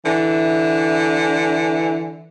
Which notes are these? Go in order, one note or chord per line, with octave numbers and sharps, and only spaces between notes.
D3 E3